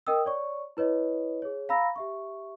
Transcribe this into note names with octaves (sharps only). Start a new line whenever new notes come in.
A#4 D#5 G5 D#6 E6
C#5 D5 C#6
E4 B4 C#5 D#5
G#4 C#5
F5 A#5 B5 E6 A#6
G4 E5 C#6